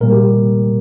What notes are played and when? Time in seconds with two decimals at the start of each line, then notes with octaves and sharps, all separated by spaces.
0.01 A#2 G3 A#3 A#4
0.12 G4